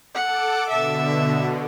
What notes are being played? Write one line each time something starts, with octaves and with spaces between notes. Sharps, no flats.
A4 F#5 D6
B2 D3 E5